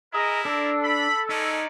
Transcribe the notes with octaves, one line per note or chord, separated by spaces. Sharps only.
E4 G#4 A#4 D#5 A#5
D4 A4
B5
G#3 C#4 D#4 D5